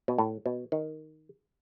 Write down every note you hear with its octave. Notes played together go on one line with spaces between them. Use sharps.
B2
A2
B2
D#3